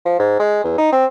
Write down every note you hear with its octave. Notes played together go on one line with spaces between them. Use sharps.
F3
G#2
G#3
E2
D#4
C4